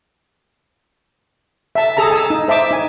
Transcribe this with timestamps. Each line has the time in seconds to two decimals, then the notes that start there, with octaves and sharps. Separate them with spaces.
1.75 E5 A5
1.97 G#4 A4 A5 A#5
2.11 G#5 A5 D#6 E6
2.30 D#4
2.48 C5 E5 A5 D6
2.71 D#4 G#5